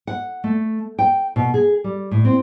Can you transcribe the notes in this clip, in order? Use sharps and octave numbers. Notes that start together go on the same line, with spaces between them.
F#5
A3
G5
B2
G#4
G3
A2
C4